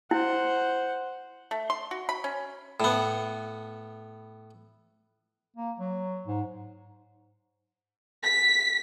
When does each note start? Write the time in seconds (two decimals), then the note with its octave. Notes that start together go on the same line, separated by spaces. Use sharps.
0.11 E4 C5 F#5
1.51 A3
1.70 C6
1.91 F#4
2.09 B5
2.24 C#4
2.80 A2 B3
5.56 A#3
5.79 F#3
6.27 G#2
8.25 B6